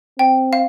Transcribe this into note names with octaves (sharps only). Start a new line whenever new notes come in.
C4 G5
F5